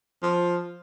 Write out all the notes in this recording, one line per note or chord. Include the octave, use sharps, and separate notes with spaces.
F3